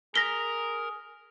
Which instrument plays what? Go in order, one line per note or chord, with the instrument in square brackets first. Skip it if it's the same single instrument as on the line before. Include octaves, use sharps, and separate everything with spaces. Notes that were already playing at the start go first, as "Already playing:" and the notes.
[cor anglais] G#4 [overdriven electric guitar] A#4 [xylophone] A#6 B6 G7